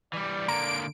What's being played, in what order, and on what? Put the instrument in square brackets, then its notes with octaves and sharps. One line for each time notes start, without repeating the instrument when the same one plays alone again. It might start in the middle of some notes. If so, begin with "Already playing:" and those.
[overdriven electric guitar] E3 G3 [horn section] D5
[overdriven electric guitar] D3 A#3 [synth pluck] A#5 [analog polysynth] D7